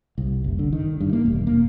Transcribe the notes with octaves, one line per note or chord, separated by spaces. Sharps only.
C2
F#1
D3
D#3
G2
A#3
E1
A#3